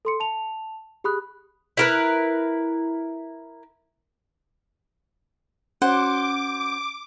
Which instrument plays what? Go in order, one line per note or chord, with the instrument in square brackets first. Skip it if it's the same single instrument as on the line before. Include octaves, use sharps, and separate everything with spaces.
[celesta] A4 C6 C#7
A5 F7
G4 G#4 B5 D#6 F#6
[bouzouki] E4 A#4 B4
[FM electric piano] C#4 F#4 [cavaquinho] C5 F#5 [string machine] D6